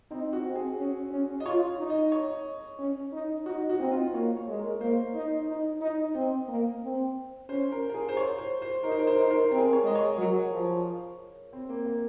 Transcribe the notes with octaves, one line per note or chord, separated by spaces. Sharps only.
C4 D#4
F#4
C4
G#4
C#4
C#4
D#5
F4 C#5
D#4
D#5
C#5
C#4
D#4
D#4 F#4
F#4
C4 D#4
F4
A#3 C#5
C#5
G#3
A#4
A#4
A#3 C5
D#4
D#4
D#4
C4 D#5
A#3
C4
C#4 C5
A#4
A#4
G#4
C5
C#5
C5
C5
D#4 A#4
C5
A#4
C5
D#4 A#4
C5
A#4
C4 A#4
G#4
A#4
C#5
G#3 D#5
C#5
F#3 A#4
F3
C4
A#3
A#3